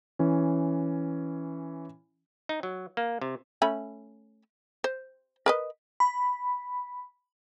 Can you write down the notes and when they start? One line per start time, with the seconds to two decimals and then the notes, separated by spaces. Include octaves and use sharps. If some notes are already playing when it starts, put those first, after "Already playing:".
0.19 E3 C#4
2.49 D#4
2.63 F#3
2.97 A#3
3.21 C3
3.62 A3 C#4 B5
4.84 C5
5.46 A#4 B4 D#5
6.00 B5